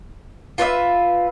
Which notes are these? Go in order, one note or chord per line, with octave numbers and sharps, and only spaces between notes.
F4 B4 C#5 E5